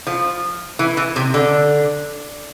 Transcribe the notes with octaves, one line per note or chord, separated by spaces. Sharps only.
F3
E3
E3
C3
D3